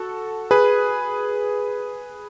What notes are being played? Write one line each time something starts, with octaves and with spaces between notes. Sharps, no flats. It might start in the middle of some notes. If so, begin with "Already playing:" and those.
Already playing: F#4 A4
G#4 B4